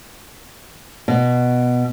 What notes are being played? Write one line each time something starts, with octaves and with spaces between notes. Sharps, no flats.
B2